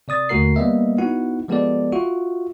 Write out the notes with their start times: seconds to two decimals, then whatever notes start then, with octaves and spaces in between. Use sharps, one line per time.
0.08 C3 D5 D#6 A6
0.29 D#2 D3 A3 F#4 A#4 C7
0.56 G3 A#3 B3 D#5 E5
0.98 B3 D#4 E4 F#4 F#5
1.48 F3 G#3 B3 G4 A4 D5
1.92 F4 F#4 E5